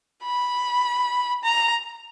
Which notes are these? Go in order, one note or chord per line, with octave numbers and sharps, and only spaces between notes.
B5
A#5